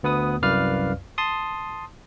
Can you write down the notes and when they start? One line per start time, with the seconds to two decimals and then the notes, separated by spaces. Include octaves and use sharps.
0.03 D2 B3 B4 D#6
0.42 C2 F#2 B4 D5 F5 F6
1.18 A5 C6 D#6